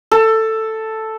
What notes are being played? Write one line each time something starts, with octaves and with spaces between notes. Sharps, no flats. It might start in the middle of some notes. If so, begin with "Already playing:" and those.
A4